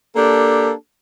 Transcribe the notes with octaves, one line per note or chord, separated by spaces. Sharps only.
A#3 D4 G4 A4